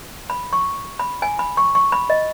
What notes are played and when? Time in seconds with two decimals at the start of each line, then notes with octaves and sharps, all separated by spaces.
0.30 B5
0.53 C#6
0.99 B5
1.22 G#5
1.39 B5
1.57 C#6
1.75 C#6
1.92 B5
2.10 D#5